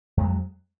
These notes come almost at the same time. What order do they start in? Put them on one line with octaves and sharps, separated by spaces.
F2 G#3 F#3